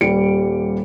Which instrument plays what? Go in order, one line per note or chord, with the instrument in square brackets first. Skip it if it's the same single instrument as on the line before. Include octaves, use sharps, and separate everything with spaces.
[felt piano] D#1 G3 C#7 D7